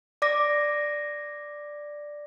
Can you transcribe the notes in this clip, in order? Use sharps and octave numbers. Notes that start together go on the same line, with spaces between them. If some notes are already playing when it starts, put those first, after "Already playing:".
D5 D6 A#6